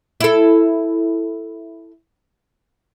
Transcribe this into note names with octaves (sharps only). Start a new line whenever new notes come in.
E4 A4